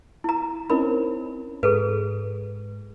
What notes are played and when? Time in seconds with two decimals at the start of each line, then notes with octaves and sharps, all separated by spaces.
0.24 E4 A#5
0.70 C4 C#4 D#4 E4 A#4 B5
1.63 G#2 G#4 A4 B4